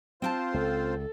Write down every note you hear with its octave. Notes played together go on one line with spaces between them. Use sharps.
C4 F4 C5 G5 A5
C#2 A4